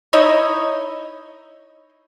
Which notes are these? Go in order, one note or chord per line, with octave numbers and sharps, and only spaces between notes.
D#4 E4 C#5 D#5